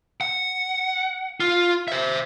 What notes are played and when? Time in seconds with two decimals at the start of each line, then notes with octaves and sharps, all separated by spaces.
0.21 F#5
1.40 F4
1.88 C5 E5